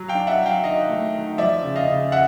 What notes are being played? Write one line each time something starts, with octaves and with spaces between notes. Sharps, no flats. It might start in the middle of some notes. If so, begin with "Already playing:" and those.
Already playing: F#3
F5 G5
D4
E5 F#5
F#3
F5 G5
D#3 D#5 F5
A3
D#3
F3 D5 E5
C#3
D#5 F5
C#3
E5 F#5